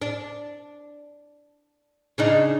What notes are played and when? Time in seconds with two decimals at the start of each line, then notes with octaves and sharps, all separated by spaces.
0.01 D4
2.18 C#3 D4 D#4